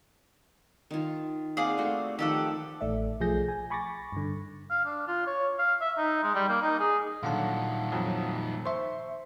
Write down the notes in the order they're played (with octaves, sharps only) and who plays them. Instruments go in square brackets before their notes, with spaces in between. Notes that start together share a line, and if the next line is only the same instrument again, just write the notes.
[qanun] D#3 F4
[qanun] A#3 C4 F#5 [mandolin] G#4 D5 F5
[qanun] A3 F#4
[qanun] D#3 F3 A3 [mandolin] G4 A4 F#5
[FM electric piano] A1 A3 D5 E5
B1 F3 A3 G#4 G6 A#6
G#5
G#5 B5 C#6 D6 A6 A#6
G2 D3
[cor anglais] F5
D4
F4
C#5
F5
E5
D#4
G#3
G3
A#3
D#4
G#4
[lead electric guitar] A#2 D#3 [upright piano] D3 F#3 [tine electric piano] F5 F#5 A5
[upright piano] F2 F#3
[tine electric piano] C5 E5 [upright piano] C6 C#6